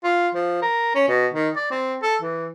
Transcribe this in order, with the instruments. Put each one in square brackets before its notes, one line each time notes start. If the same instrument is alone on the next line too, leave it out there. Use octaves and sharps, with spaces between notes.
[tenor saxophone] F4
F3
A#4
C#4
B2
D#3
D5
C4
A4
E3